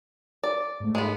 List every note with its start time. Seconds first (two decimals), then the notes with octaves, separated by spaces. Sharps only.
0.44 D5
0.80 G#2 A3
0.95 G#3 B3